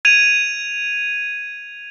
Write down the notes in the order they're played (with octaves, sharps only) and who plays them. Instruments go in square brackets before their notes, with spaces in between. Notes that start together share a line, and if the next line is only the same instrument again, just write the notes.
[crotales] G#6 D#7 F7